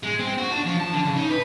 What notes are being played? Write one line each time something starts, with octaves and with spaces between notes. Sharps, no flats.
G#3
C4
F#4
D4
F3
A5
D3
C#3
D#4
B4